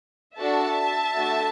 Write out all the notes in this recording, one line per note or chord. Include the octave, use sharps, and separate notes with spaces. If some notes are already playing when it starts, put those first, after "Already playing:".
D4 F#4 A4 E5 A5
A3 D4 F#4